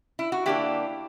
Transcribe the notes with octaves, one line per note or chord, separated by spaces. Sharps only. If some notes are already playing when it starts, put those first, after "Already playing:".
E4
F#4
D3 A#3 D4 E4 G4